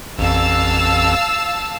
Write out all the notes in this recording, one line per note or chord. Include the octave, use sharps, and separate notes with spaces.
A1 F2 F5 A5 E6